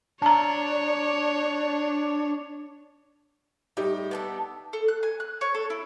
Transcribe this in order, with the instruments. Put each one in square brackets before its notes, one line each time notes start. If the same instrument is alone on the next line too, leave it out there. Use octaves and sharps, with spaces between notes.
[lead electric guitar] D4 [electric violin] C#5 [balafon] A5 A#5
[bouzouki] A2 [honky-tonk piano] G3 D#4 G4
[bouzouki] B3 D4 A4
[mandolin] A4
F#6
G#5
F#6
C#5
A4
E4